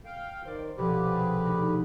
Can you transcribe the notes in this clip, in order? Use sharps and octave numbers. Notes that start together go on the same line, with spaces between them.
F5 G5
D#3 C5 D5
C2 B2 D3 F3 G4 B4
D4 G#4
D2 D#4 B5